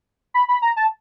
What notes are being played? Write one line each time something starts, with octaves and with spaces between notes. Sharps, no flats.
B5
B5
A#5
A5